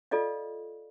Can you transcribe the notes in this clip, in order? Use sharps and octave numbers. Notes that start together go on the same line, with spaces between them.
F4 A4 D5 D#5 F5